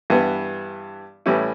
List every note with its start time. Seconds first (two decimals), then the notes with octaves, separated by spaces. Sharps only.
0.10 G2 E3 B3
1.26 A2 E3 G3 C#4 E4